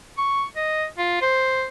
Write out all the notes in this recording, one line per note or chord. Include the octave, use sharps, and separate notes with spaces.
C#6
D#5
F4
C5